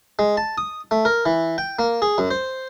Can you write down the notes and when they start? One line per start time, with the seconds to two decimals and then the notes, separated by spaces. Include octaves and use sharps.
0.19 G#3
0.37 A5
0.58 D#6
0.91 A3
1.05 A#4
1.26 E3
1.58 G5
1.79 A#3
2.02 G#4
2.18 F#2
2.31 C5